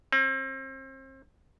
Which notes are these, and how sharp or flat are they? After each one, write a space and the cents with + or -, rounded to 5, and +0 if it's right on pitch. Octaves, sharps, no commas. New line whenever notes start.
C4 +35